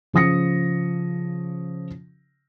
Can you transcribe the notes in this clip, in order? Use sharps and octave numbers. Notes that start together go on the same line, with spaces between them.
C#3 F3 D#6 A#6 C#7